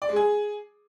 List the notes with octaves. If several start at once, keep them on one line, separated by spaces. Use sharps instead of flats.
D5
G#3
G#4